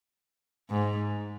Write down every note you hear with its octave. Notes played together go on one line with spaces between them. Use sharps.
G#2